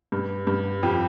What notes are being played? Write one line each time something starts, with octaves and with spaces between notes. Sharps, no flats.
G2
G2
F2 G4